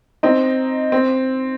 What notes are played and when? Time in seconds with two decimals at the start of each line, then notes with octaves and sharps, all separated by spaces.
0.23 C4 D#4
0.92 C4